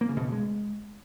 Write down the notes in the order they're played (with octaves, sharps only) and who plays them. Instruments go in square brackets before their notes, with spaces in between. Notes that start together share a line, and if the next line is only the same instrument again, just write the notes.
[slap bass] A#3
C#3
B2
C#3
G#3